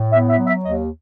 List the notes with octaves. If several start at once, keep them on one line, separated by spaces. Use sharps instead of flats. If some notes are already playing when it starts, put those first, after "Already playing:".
Already playing: A2
B3 E5
E5
F#3
E5
D#2 D#5